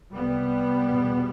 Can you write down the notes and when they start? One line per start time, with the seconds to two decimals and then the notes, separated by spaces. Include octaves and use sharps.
0.14 C2 C3 G3 B3
0.85 E2 B2